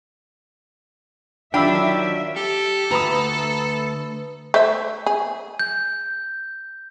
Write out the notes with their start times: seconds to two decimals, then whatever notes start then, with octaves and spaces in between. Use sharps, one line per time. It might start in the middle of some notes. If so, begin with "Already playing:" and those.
1.54 D#3 F#3 D4 F4 E5 G5 B5 E6
2.36 G4 A4
2.91 D2 B4 A#5 B5 D#6
4.54 A3 C5 E5
5.06 G#4
5.59 G6